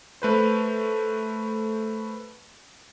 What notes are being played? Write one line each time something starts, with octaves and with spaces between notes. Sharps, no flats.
A3 B4 C5